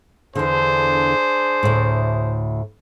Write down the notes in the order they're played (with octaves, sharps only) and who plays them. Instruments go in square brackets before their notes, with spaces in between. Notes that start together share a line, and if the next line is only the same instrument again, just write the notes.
[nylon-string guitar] E2 D3 [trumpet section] D4 G#4 C5
[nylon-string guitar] D2 A2